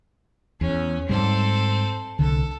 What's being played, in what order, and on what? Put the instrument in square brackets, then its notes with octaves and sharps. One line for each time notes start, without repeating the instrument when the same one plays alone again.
[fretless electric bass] E2 [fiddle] C#4
[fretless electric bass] G#2 G3 [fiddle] C4 A4
[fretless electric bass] C2 D3 [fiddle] A4